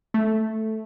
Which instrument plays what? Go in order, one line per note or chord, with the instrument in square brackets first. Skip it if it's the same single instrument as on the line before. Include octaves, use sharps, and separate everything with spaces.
[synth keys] A3